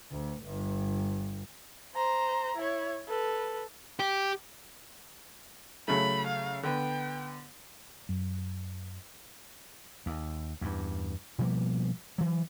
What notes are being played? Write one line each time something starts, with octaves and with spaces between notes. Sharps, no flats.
D2
G1
C5 A#5
E4 C#5
A4 B4
G4
C#3 F#3 A3 B5
F5
D3 B3 G5
F#2
D#2
E2 G2
B2 F3 G3 A#3
E3 F#3